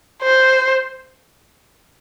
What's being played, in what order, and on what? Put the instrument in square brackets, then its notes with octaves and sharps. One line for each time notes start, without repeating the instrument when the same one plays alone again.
[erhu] C5